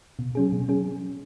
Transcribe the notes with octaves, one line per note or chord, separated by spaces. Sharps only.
B2
F#3 C#4 G#4
B2
F#3 C#4 G#4